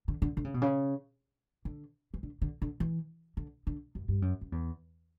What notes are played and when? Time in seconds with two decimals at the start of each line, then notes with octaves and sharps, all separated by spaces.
0.08 D3
0.22 D3
0.37 D3
0.45 C#3
0.54 B2
0.62 C#3
1.65 D3
2.14 E3
2.23 D3
2.42 D3
2.62 D3
2.80 E3
3.37 D3
3.67 D3
3.95 F#2
4.08 G2
4.22 F#2
4.41 F#2
4.52 E2